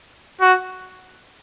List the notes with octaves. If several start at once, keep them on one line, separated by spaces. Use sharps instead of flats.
F#4